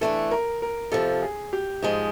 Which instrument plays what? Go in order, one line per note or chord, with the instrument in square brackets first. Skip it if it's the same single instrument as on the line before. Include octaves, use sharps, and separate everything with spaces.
[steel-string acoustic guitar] E3 A3 D4 [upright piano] A4
[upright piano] A#4
A#4
[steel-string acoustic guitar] F2 C3 F3 [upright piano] A4
[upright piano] G#4
G4
[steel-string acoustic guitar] G#2 F3 G#3